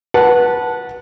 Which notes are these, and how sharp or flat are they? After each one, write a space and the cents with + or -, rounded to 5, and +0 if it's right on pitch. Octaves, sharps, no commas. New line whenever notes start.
B4 -20 F#5 +0 A5 +0